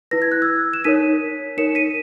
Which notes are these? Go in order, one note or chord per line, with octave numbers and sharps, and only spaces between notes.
E4 B4 A#6
G#6
F#6
E6 G#6
E7
D#4 A#4 C#5 B6 D#7
D#4 A#4 C#5 C#7 E7
B6 D#7